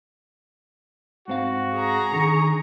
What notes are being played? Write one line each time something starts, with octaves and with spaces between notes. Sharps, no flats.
G#2 C4 F#4 F5
G#4 A#5
D3 D#3 C#6